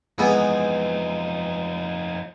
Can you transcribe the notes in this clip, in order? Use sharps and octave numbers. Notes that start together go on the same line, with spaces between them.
F2 E3 G#3 B3 D#4